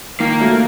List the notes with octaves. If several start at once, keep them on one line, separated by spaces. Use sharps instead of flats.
D#3 A#3
F#3 A3